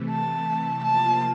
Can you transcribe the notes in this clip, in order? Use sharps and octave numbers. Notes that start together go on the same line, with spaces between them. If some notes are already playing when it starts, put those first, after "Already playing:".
Already playing: C3 E3 A3
A5
C3 F3 A#3 F4 A5